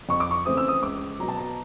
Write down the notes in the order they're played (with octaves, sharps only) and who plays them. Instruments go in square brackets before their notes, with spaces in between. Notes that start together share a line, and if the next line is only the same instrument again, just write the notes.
[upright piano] F2 C#6
D6
C#6
C#3 E3 A3 C4 D#6
E6
D#6
C#2 D6
B2 F#3 A#5
A5
A#5